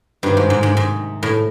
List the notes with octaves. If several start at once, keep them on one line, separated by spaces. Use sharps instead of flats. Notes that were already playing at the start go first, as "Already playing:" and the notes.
G2 C3 D#3 F#3 A#3
G#2
G#2
G#2
G#2
A2